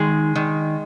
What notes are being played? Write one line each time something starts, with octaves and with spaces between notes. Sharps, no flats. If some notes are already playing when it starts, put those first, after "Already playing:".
Already playing: D#3 G#3
D#3